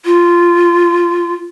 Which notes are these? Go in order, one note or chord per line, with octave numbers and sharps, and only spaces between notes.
F4